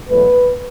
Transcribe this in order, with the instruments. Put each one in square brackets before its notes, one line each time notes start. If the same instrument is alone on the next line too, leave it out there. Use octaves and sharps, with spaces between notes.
[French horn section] E2 B2 F#3 A3 B4